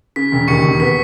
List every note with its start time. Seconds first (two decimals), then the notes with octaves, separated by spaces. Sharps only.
0.16 C#3 B6
0.32 E1
0.48 D#2 C#6 C#7
0.64 E1
0.80 B3 B6